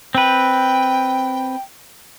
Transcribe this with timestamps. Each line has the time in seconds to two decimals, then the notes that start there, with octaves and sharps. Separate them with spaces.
0.15 C4 B4 G5